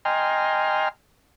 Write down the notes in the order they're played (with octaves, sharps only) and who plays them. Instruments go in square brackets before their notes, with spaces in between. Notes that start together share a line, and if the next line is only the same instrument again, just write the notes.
[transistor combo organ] D#5 G5 G#5 A#5 C6 F6